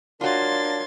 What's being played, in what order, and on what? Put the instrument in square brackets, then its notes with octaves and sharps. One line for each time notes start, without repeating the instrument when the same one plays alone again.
[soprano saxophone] D4 [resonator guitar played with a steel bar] F4 F#4 [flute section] A#4 C#5 F5 [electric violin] C6 A6